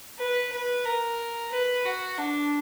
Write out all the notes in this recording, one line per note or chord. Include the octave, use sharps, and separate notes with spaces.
B4
B4
A#4
B4
F#4
D4